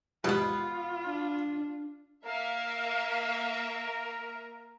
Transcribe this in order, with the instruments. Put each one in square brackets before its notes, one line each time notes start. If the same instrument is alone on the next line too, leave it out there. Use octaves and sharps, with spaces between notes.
[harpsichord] A#1 D#2 G#2 [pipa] B2 B3 [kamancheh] F4
[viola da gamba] D4
[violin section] A#3 E5 [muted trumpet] A#4 [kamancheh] F5